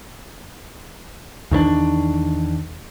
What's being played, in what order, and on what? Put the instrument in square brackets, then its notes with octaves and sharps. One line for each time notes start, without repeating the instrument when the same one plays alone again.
[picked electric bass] E2 D#3 B3 D4